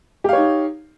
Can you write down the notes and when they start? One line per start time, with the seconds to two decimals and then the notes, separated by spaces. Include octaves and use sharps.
0.24 G4
0.29 F5
0.33 C#5
0.37 D#4